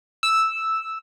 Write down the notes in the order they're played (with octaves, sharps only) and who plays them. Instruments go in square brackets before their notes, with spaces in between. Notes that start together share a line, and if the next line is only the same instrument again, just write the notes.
[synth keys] E6